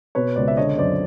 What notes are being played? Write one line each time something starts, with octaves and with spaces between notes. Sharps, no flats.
B2 B4 C#5
C#2 C5 D5
E5
D3 C#5 D#5
D#5
F#2 C5 D5